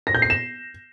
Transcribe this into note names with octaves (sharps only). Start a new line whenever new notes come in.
A#6
G6
C7
E7